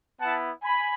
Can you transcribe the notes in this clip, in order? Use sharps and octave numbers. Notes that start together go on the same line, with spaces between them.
B3 E4 F#5 A5
G#5 B5